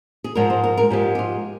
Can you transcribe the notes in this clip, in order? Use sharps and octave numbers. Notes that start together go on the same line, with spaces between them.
G#4
G#2 F3 G#3 A#4
C5
A#4
A#4
G#2 F3 G#3 G4
G4
F4